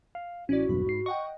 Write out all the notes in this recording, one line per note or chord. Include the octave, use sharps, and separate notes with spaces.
F5
A1 C#4 E4 F#4 D5
B1 E2 G2 B5
G#2 C7
D#5 F#5 G5 C#6